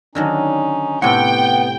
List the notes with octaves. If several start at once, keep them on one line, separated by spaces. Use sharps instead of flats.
D3 D#3 F#3 C#4 D#4
A2 C3 B3 F#5 G5